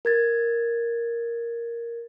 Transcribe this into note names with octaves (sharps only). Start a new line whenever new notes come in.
A#4 G#6 A6